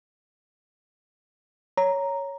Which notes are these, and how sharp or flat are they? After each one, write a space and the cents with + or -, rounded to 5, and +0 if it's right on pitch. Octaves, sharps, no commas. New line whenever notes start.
C#5 +5 A#5 +0